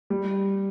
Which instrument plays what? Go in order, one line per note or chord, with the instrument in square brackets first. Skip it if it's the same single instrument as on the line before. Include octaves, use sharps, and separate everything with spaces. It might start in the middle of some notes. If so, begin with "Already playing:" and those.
[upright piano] G3